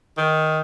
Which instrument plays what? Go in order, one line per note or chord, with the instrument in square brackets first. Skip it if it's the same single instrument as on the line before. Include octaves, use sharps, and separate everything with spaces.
[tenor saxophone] D#3